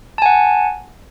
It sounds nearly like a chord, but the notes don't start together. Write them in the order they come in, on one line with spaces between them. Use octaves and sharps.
A5 G#5 F#5